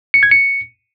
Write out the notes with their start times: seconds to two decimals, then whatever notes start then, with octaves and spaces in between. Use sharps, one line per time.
0.14 C#7
0.23 G#6
0.31 C#7